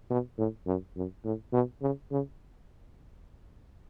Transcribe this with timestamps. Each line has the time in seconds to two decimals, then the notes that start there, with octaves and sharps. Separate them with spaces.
0.10 B2
0.38 A2
0.67 F#2
0.96 F#2
1.25 A2
1.53 B2
1.82 C#3
2.11 C#3